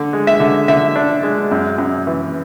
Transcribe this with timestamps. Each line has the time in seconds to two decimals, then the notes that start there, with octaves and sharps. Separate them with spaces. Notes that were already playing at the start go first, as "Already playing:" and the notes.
Already playing: D3
0.13 G#3
0.27 E5
0.40 D3
0.68 D3 E5
0.96 D4
1.23 G#3
1.51 F#2
1.78 F#2
2.07 E3